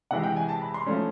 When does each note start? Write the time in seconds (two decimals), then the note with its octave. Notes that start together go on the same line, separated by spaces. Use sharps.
0.11 C3 E3 G#3 F#5
0.23 G5
0.36 G#5
0.49 A5
0.62 B5
0.74 C6
0.86 F3 A3 C#4